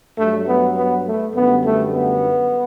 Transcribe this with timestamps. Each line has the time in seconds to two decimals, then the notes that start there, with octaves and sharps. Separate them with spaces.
0.18 G2 F#3 A3
0.48 B3
0.77 B3
1.07 A3
1.36 F#2 D3 G3 B3
1.65 A3
1.95 B3